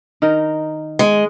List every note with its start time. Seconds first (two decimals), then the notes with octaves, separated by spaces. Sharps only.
0.22 D#3 D#4 A#4
0.99 G#3